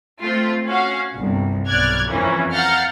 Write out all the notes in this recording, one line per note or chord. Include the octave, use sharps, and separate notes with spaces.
A3 C4 F4
C#4 F#4 F5
G1 C2
B1 D5 F6 F#6 G#6
F2 E3 A#3 C#4
F5 F#5 A#5 F6 G6 A6